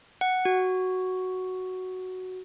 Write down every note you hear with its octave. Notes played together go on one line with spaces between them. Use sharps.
F#5
F#4